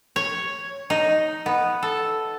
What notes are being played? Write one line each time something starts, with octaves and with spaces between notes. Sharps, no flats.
C#5
D#4
B3
A4